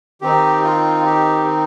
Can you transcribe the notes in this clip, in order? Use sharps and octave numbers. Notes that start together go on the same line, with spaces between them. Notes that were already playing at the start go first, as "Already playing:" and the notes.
D#3 C4 D#4 G4
F4
G4